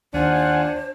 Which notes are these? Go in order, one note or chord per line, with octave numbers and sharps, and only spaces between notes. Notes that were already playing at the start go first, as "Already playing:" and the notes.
D#2 D4 F4 C5 F#5 G#5